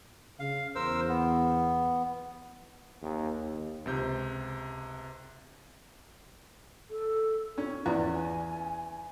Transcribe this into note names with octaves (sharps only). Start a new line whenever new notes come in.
C#3 F5
E2 A#4 C5 E6
B3
D#2
D#2
C#2 C3 G6
A4
C4 C#4
E2 D5
G#5